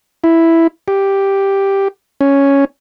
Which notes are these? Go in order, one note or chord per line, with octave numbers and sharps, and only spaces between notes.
E4
G4
C#4